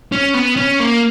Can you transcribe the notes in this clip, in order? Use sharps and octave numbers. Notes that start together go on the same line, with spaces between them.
C#4
B3
C#4
A#3